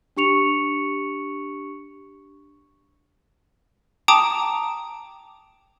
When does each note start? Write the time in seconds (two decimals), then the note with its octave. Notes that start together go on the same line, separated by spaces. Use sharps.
0.17 D4 G4 C#6 C#7 F7
4.08 G5 A5 A#5 D6 D#6